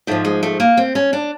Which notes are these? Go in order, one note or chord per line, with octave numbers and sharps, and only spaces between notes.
G#2 F3 A3
G#3
A3
A#3
C4
C#4
D4